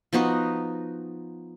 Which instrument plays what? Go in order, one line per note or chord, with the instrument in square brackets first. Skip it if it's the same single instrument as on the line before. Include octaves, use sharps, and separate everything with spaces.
[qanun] F3 B3 D#4 F#4